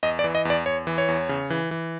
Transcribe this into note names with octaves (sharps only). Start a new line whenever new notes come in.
E2 D#5
D5
E3
D#5
E2 D5
E2 C#5
E3
C#5
E2
C#3
E3
E3